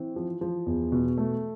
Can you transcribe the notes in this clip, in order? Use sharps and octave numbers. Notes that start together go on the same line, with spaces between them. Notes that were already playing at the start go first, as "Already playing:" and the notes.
Already playing: E3 C4
F3
F3
E2
B2
A3